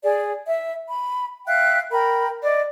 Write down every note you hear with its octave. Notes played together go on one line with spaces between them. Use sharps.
G#4 D5
E5
B5
E5 F5 G5 F#6
A#4 G5 B5
D5 D#5